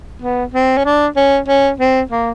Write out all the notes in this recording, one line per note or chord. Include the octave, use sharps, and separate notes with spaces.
B3
C4
C#4
D4
C#4
C#4
C4
A#3